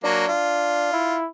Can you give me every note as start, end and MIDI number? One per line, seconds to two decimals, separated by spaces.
0.04 0.27 54
0.04 0.27 58
0.04 0.92 62
0.28 1.17 65
0.93 1.26 64